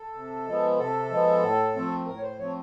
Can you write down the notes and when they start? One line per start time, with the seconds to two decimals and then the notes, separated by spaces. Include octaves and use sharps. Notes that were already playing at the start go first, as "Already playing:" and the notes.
Already playing: A4
0.14 C3
0.47 F3 G#3 B3
0.78 C3 A4
1.10 F3 G#3 B3
1.43 A2
1.75 F3 A3 C4
2.07 A2 A#4
2.17 C#5
2.23 C5
2.39 F3 A3 C4 C#5